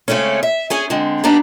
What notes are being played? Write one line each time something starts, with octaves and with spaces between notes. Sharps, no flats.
C#3 G#3 A3 C4 C#4
E5
C#4 G#4 G#5
D3 G#3 C4
G3 B3 D4 D#4